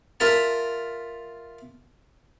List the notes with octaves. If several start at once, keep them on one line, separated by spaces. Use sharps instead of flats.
F4 A#4 E5 A5